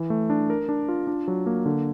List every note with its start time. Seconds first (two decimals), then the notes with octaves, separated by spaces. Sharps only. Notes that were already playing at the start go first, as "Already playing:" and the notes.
Already playing: E3
0.10 A3
0.30 D4
0.50 A#4
0.69 D4
0.89 F4
1.07 D4
1.28 F#3
1.46 A#3
1.66 D3